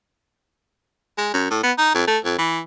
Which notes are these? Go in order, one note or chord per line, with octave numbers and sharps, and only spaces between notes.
G#3
F#2
A2
B3
D#4
F2
A3
F2
E3